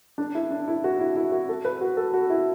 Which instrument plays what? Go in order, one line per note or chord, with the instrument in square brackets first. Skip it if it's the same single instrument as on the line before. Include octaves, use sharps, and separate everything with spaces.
[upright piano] D4
E4
D4
E4
F#4
E4
E4
F#4
A4
B4
F#4
A4
F#4
E4